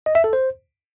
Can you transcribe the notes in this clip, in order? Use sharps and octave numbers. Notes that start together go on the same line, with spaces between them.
D#5
E5
A4
C5